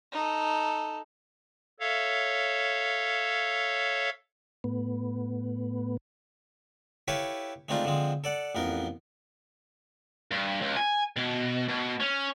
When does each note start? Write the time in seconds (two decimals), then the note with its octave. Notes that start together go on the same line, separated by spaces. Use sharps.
0.12 D#4 A4
1.80 A4 C#5 E5 F5
4.64 A2 B3
7.08 E4 G4 A4 B4 C#5 F5
7.69 G#3 A3 C4 D4 D#4 F4
7.85 D3 F3 G#3 C4
8.24 A4 D5 F#5
8.55 A1 F2 B3 A#4
10.31 G2
10.61 C#2
10.77 G#5
11.17 B2
11.68 B2
12.00 C#4